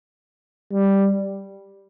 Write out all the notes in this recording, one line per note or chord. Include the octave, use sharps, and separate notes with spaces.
G3